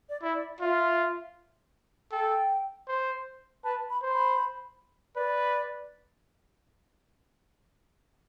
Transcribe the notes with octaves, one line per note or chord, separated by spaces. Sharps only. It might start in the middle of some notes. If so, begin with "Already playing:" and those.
D5
E4
D5
F4 E5
A4 G5
C5
B4 A5
B5
C5
B5
B4 D5